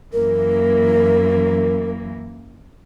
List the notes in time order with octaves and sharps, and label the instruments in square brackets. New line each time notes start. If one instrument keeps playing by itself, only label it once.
[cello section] F#2 E3 A#3 [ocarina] A#4